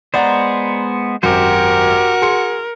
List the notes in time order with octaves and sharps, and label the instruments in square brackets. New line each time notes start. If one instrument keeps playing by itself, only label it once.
[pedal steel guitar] G#3 B3 C5 [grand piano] D5 F#5 A#5
[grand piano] G#1 F#2 [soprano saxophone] F#4 [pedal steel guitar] G4 C5 [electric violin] A#4
[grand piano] G#4 C6 C#7